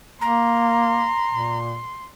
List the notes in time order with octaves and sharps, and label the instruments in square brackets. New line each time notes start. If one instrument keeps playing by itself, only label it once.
[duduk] A#3 [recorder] A#5 [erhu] C6
[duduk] A#2